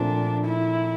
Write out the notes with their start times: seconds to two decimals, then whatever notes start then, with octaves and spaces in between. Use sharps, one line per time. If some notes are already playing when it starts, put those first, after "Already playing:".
Already playing: A#2 F3 A3 C4 D4
0.45 E4